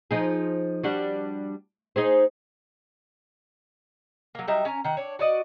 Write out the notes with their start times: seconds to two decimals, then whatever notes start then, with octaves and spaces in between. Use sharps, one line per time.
0.11 F3 D#4 G#4
0.84 G3 D4 F#4
1.96 D#4 G#4 C5
4.35 F#3 A#3
4.48 F#3 G3 D#4 E5
4.65 C#4 G#5 A#5
4.84 D#3 F#5
4.97 D4 C#5
5.19 F#4 D5 D#5